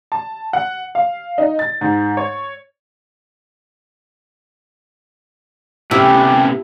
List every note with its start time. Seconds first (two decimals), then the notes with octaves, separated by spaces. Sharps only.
0.12 A5
0.53 F#5
0.95 F5
1.38 D#4
1.59 A6
1.81 G#2
2.17 C#5
5.91 C3 A3 B3 C#4 E4 G4